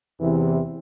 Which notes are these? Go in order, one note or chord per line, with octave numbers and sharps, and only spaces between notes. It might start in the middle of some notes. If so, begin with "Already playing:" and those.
E2 C3 E3